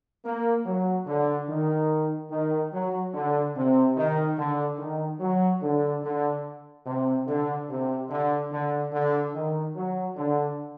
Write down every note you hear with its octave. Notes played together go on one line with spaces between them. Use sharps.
A#3
F#3
D3
D#3
D#3
F#3
D3
C3
D#3
D3
D#3
F#3
D3
D3
C3
D3
C3
D3
D3
D3
D#3
F#3
D3